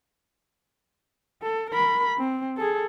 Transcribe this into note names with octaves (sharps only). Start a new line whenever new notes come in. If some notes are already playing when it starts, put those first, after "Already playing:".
A4
A#4 B5
C4
G#4 A4